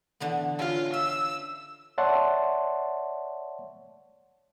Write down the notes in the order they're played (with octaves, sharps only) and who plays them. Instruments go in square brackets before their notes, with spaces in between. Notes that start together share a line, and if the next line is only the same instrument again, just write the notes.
[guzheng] D3 E3 B3
[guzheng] C#4 F5 [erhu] F4
[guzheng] E5 [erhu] E6
[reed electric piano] C#5 D5 E5 F#5 A5 C6